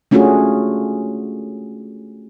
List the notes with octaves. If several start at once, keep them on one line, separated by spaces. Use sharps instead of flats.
A3 C#4 D4 F4 F#4 G#4